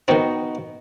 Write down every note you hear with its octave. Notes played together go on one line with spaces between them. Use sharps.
D#3 B3 C4 D#4 F#4